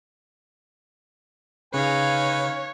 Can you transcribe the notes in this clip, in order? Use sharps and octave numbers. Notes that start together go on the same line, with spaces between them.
C#3 D#4 B4 C#5 F5 G#5